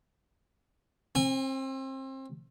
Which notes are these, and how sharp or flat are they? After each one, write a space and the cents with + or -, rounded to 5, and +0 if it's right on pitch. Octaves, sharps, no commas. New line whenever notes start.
C4 +30 G#5 -35